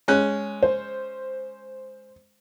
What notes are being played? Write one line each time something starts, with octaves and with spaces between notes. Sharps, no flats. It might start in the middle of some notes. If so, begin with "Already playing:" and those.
G#3 C#4 F#6
C5